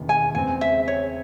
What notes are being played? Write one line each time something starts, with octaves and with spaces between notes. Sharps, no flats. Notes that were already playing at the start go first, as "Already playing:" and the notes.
Already playing: E1 D#2 C#3 E3
G#5
E2 C#3 G#3 C4 G#5
E5
C#5